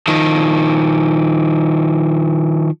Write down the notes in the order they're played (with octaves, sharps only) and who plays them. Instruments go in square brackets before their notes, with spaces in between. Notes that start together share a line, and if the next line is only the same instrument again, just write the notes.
[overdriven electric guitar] D#3 F3